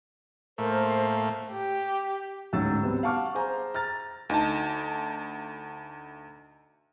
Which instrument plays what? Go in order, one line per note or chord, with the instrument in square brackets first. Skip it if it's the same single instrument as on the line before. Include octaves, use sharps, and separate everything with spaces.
[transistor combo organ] A2 A3 A#3 [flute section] A#4 C5
[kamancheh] G4
[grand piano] D1 G#2 F#3 C#4 E6 A6
G3 B3 C4
F5 F#5 A5 C#6 D6 F6
G#4 C5 G#5 A#5
A#5 F6 A6
[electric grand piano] D2 D#4 A5